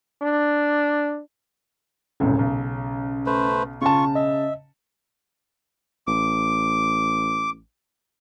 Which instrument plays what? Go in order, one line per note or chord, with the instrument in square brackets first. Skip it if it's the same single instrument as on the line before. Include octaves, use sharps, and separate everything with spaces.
[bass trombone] D4
[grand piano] E1 C2 A2 [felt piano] C#3 [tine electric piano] C#4
[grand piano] B1
[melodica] A3 B4 C5
[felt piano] C#3 A5 [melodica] F4 C#6
[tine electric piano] D#5 [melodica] E5
[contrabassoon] A1 [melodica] D6